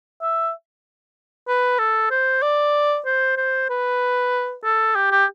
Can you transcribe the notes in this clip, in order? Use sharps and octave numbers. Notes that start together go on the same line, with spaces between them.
E5
B4
A4
C5
D5
C5
C5
B4
A4
G4
G4